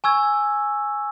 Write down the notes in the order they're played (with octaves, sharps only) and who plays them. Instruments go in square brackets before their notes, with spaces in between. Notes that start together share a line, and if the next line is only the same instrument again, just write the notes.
[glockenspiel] G#5 C#6 E6 G#6